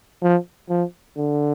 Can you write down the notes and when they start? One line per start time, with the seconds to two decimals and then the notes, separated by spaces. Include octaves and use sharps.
0.22 F3
0.69 F3
1.17 D3